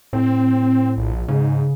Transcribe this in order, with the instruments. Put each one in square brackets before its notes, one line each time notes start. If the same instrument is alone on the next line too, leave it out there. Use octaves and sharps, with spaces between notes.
[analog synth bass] A2 [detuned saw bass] C4
[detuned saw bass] A#1
[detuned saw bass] G#2 [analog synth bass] C#3